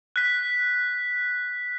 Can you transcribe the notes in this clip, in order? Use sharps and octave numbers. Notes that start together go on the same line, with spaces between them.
F#6 B6